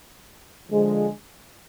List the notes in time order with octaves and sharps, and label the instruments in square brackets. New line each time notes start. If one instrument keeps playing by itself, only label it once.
[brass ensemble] D3 F3 G#3